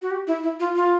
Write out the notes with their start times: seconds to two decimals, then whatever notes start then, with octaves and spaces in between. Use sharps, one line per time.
0.02 F#4
0.11 G4
0.27 E4
0.43 E4
0.60 F4
0.75 F4